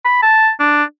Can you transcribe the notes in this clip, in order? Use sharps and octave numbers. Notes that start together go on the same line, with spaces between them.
B5
A5
D4